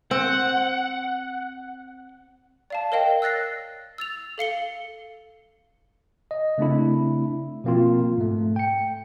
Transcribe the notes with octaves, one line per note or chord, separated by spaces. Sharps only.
C4 F#5
D5 F5 A5
A#4 C#5 D#5 F5 G5
E6 F#6 A6 A#6 C7
E6 A6 F7
A4 F5 C#7 G7
D#5
C#3 A3 C4 D4 E4
B2 F3 A#3 C4 F4
G#2 A3
G5 C#7